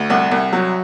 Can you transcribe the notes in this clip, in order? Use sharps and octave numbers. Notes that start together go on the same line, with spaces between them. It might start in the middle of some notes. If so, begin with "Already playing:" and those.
Already playing: D2
C2 F#5
C2
F#3